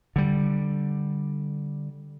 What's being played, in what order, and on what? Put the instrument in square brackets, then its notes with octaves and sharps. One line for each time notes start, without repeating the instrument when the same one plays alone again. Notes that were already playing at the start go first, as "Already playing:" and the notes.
[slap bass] D3 G3